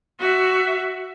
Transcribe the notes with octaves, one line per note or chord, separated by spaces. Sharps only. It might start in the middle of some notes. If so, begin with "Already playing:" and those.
F#4 E5